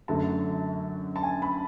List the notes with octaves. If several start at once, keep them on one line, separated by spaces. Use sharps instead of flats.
F#2 D3 F#3 A3 A5
A5
G#5
B5